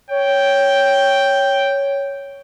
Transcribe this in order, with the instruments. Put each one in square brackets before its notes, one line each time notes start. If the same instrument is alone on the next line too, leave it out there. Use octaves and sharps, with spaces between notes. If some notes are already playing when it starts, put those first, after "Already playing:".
[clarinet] C#5 [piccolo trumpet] G5